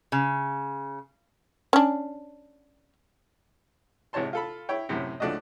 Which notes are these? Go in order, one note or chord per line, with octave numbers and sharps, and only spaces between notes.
C#3
C#4 D4
G#1 C3 E3 C#5 A5 C6
F4 A4 B5
E4 C#5 G5
F#2 A2 C3
C#2 F3 A3 D4 F#4 D#5